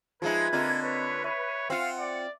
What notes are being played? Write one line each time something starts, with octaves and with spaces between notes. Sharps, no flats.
F3 G#3 D#4 F4 G#4 B4 E5 G#6
D3 A#3 C4 F4 D#5 A#5
B4 C#5
C#5 E5
C4 F4 F5 F#5
D5